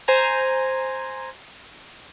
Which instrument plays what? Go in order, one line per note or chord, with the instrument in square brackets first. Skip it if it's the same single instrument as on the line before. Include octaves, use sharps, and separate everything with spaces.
[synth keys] C5 G#5 A#5